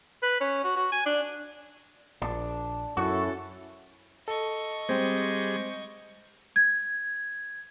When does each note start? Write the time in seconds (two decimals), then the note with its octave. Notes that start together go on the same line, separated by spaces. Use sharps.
0.23 B4
0.41 C#4
0.64 F#4
0.76 F#4
0.92 G#5
1.06 D4
2.22 A#1 D4
2.97 F#2 C#4 E4 F#4 A4
4.28 A4 D#5 C#6
4.89 G3 G#3 C4 C5 G5
6.56 G#6